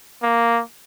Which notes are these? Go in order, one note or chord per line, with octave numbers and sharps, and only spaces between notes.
A#3